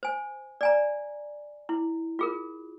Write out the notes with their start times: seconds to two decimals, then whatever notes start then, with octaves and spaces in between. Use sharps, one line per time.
0.03 C5 G#5
0.61 D5 G#5 A#5
1.69 E4
2.19 F4 G#4 A#4